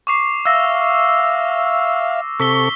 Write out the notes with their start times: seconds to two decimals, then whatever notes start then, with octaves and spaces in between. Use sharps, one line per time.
0.07 C#6 D6 C7
0.46 E5 F5 E6 A#6
2.40 C3 A4 C#6 E6 B6 G7